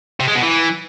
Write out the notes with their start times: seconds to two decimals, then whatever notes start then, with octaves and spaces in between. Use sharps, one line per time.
0.20 C3
0.28 G#3
0.35 B2
0.43 E3